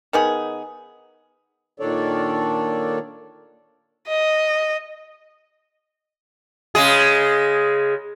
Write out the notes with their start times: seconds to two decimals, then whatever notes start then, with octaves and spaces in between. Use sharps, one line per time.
0.13 D#3 B3 G#4
1.80 A#2 D#3 D4 A4 C#5 D5
4.08 D#5
6.75 C#3 G#3 G#4